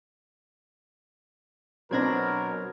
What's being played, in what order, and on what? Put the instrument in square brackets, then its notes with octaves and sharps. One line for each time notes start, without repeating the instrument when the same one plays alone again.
[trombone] B2 [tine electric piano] F#3 G#6 A#6 [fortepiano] C4 D4 [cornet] A#4